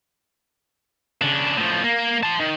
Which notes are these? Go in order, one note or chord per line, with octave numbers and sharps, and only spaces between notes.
C#3 D4
A2 F3
A#3
A5 C6
D#3